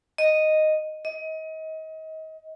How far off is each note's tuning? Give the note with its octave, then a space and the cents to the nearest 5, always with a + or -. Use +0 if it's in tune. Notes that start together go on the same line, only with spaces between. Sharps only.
D#5 -5
D#5 +30